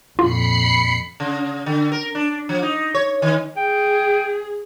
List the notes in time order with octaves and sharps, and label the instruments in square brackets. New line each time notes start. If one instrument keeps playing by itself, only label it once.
[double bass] F2 A#2 [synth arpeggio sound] F4 [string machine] B5 C7 C#7
[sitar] C#3
D3
A#4
D4
F3
D#4
C#5
D#3
[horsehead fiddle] G#4 [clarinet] G5